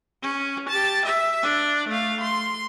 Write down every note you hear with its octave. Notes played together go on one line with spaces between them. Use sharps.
C#4
G4 A5
E5
D4
A3 F5
C6